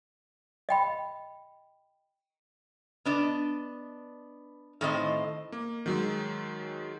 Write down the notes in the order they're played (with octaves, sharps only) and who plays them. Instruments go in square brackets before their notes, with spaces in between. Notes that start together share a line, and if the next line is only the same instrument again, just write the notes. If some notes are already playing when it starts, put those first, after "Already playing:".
[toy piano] D#5 G5 B5
[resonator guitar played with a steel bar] B3 D4 D#5
A2 D#3 C4 D#5
[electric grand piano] A#3
D#3 F#3 G#3